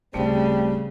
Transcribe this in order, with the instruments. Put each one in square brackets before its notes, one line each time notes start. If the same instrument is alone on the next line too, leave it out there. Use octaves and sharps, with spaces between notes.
[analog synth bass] D1 [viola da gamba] C#3 [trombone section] G3 C4 [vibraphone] A3